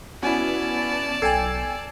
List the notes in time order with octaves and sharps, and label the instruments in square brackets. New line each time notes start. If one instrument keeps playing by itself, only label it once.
[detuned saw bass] B3 [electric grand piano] C#4 E4 [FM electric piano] F#4 G#5 [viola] D5 A5
[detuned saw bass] B1 [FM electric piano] A4 G5 G#5 [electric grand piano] E6 G#6 C7